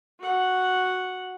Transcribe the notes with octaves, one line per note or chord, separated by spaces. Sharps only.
F#4 F#5